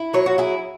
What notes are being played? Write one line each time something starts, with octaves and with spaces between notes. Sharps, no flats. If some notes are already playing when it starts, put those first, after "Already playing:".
Already playing: E4
F#3 C#5
F#4
E4 G#4